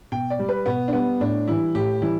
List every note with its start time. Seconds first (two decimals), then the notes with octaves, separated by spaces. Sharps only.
0.12 B2 G5
0.30 D5
0.39 G3
0.49 B4
0.66 B2 B3
0.88 D4
0.93 G3 B3
1.20 A2 D4
1.47 E3 G3 E4
1.75 A2 G4
2.01 E3 G3 E4